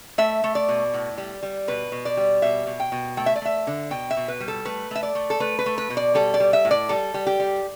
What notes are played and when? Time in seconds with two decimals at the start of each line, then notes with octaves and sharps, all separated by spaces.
0.18 A3 E5
0.44 A3
0.55 D5
0.69 B2
0.93 A2
1.18 G3
1.43 G3
1.68 B2 B4
1.92 B2
2.05 D5
2.17 G3
2.42 B2 E5
2.67 B2
2.80 G5
2.92 B2
3.17 A3 G5
3.26 E5
3.36 D5
3.42 A3 E5
3.67 D3
3.91 B2 G5
4.11 E5
4.17 B2
4.28 B4
4.40 G3
4.48 A4
4.65 A3 B4
4.91 A3 E5
5.03 D5
5.15 A3
5.30 A4
5.40 A3 B4
5.59 B4
5.66 A3
5.78 B4
5.90 B2
5.97 D5
6.15 G3 A4
6.34 D5
6.40 G3
6.53 E5
6.65 A2
6.71 D5
6.89 G3 A4
7.14 G3
7.26 G4
7.40 G3